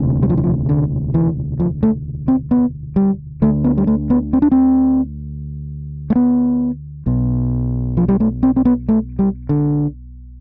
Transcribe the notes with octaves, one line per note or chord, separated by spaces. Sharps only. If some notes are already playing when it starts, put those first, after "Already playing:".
Already playing: E1 D2 C3
G3
F3
E3
F3
D3
E3
F3
A3
C4
B3
G3
D2 D3 A3
B3
G3
A3
B3
C4
D4
C4
A3
B3
B1 B2
F3
G3
A3
C4
C4
B3
A3
G3
D3